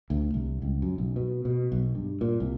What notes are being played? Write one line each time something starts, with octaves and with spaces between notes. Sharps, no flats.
D2
C2
C#2
F#2
B1
B2
B2
B1
G2
A#2
C2